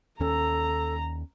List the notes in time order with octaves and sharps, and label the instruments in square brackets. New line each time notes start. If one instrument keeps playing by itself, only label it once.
[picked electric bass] D#2 C#4 [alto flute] A4 [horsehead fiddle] A#5